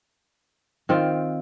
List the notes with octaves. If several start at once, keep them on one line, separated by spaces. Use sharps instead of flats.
D#3 C4 F4